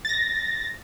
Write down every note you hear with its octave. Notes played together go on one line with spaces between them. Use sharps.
A6 A#6